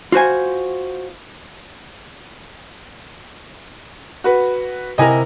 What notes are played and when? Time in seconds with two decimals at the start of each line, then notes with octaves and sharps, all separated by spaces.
0.12 F4 F#4 C5 G#5
4.24 F#4 B4
4.98 C3 E4 A#4 D#5 G#5